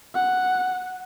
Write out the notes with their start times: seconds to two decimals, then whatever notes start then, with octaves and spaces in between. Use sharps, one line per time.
0.15 F#5